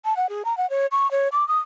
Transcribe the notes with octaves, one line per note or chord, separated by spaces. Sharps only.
A5
F#5
G#4
A#5
F#5
C#5
C#6
C#5
D6
D#6